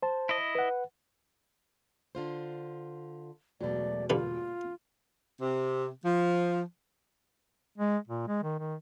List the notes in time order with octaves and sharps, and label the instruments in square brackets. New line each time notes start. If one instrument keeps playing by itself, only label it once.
[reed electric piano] C5 A5
[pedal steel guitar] E4 D#5
[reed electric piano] B4 F#5
[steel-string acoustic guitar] D3 F4 C5
[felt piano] E1 B2 [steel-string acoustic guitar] F#3 A3 [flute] D5
[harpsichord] G2 D3 B4 [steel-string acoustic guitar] A#2 [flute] F4
[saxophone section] C3
F3
[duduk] G#3
A#2
G#3
D#3
D#3